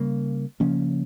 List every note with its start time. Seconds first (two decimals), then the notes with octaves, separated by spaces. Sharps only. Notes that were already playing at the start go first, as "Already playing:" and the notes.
Already playing: C#3 G3 A#3
0.60 C#3 F3 A#3 C#4